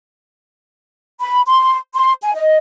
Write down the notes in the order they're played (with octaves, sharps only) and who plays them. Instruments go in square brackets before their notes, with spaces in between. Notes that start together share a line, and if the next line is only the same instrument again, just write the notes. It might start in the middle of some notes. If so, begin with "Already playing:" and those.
[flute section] B5
C6
C6
G#5
D#5